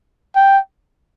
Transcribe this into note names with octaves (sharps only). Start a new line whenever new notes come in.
G5